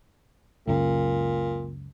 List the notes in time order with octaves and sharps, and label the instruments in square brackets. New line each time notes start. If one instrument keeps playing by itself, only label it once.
[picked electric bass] C#2 F#2 C#3 [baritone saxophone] A#2